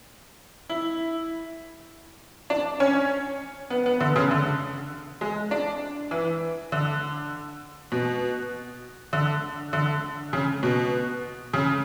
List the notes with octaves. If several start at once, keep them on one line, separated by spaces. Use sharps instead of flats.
E4
D4
C#4
B3
B3
D3
C#3
D3
G#3
D4
E3
D3
B2
D3
D3
C#3
B2
C#3